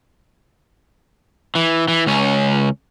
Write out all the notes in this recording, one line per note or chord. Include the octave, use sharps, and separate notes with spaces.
E3
E3
C#2 C#4